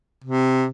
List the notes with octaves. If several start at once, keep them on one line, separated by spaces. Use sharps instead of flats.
C3